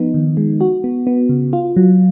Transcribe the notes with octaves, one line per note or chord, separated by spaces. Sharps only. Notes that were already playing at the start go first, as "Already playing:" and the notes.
Already playing: F3 B3 D#4
D#3
G#3
F#4
B3
B3
C#3
F4
F#3